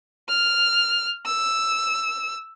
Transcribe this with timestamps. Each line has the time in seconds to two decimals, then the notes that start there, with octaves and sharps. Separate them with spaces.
0.29 F6
1.26 E6